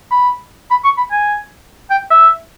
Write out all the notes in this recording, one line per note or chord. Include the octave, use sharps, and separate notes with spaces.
B5
B5
C#6
B5
G#5
G5
E5